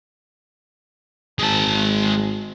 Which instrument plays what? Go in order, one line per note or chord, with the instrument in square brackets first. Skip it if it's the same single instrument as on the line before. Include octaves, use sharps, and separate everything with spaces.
[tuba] G#1 [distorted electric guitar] G#3 A5